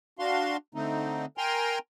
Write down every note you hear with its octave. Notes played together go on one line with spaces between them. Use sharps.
D4 F#4 F5 C6
D3 A3 C4 D#4
A#4 G5 G#5 A#5 C6